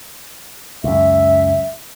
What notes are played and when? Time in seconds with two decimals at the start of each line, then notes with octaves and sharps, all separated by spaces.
0.84 C#2 F#2 E5